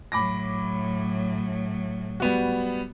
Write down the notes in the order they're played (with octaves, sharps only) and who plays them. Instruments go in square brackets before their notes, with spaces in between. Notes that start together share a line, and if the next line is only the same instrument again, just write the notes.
[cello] A2 F#3 [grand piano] B5 D6 A#6
[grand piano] G3 B3 F#4